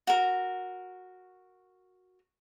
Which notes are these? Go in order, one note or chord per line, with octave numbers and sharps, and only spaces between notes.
F#4 A#4